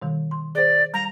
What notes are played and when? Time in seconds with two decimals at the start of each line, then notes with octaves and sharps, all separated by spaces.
0.02 B2 D#3 G3
0.31 C6
0.55 G#4 C5 D5
0.94 G3 A#5